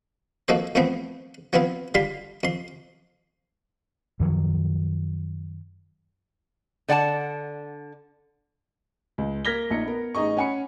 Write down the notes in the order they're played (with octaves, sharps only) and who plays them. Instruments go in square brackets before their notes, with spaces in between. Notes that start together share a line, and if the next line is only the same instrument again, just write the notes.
[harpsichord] F2 A#3 D#4 F#4 A4 C5
F2 A2 E3 F3 B3 C4
F3 B3 C4 E4 F4
D3 G3 F4 B5 C6
F2 C6
[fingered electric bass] F#2 D#3 F3 F#3
[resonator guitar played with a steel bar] D3 D5 F#5 G#5 A5
[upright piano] C#2
A#3 F6 G#6 A#6 B6 G7
A#1 D#4 C#7
B3 A#4
A1 D#4 G#4 D#5 C#6
C#4 F#5 G#5 B5 C#7